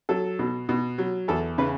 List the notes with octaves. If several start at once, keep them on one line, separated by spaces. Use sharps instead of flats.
F#3 A4
B2
B2
F#3
E2 A4
C#3 B4